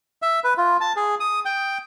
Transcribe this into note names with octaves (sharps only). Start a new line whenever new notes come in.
E5
B4
F4
A5
G#4
D#6
G5